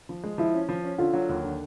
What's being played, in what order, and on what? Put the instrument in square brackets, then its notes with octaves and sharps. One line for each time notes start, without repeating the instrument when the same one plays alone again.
[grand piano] F3
G#3
[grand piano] F3 [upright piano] E4
[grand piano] C#4
F3
C#4
[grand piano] D3 [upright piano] F4
[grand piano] F#3
D#2
D3